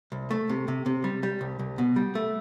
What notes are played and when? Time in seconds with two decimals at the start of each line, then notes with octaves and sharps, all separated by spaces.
0.12 C2
0.31 A3
0.49 C3
0.68 C3
0.86 C3
1.04 G3
1.23 G3
1.41 C2
1.59 C2
1.78 B2
1.96 G3
2.15 A3